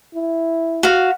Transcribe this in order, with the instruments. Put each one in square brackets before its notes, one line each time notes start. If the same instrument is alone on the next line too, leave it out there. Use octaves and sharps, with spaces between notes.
[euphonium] E4
[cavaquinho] F#4 F5